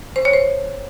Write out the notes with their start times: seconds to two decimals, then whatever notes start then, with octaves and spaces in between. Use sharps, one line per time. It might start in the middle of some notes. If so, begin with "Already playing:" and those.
0.16 C5
0.25 C#5
0.33 C5